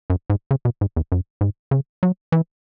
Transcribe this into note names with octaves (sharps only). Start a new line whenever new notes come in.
F#2
G#2
C#3
B2
G#2
E2
F#2
G#2
C#3
F#3
E3